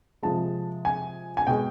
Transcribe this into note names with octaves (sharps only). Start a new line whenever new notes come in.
C3 F3 G#3 A5
G#5
G#5
B2 G#3 G5